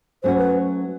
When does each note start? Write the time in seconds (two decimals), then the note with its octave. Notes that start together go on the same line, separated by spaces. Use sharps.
0.23 F#3 A3 C#4 F#4 C5
0.38 B4